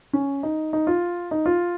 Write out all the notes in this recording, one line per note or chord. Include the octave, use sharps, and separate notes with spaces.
C#4
D#4
D#4
F4
D#4
F4